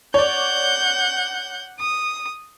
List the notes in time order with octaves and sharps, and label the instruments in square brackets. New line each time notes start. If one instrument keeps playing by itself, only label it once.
[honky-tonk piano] C#5 D5 [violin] F#5 G6
[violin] D#6